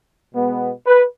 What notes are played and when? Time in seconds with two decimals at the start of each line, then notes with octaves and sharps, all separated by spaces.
0.34 B2 G#3 B3
0.87 B4